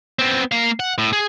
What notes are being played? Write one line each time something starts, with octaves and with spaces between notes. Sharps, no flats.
B3 C4
A#3 F5
F#5
A2
G#4